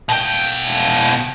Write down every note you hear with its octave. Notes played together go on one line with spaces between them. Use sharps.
B2 G5